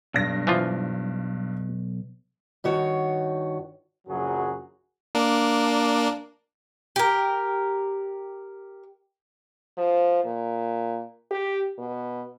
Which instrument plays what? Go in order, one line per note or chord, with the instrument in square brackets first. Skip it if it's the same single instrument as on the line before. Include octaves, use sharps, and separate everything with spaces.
[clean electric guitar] B1 [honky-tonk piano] G2 A#6
[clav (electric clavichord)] E3 F3 F4
[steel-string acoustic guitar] G2 D#3 F#4 C#5
[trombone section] A#1 F#2 C#3 F#3 F#4 G#4
[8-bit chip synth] A#3 D4
[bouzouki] G4 A#4
[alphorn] F3
A#2
G4
B2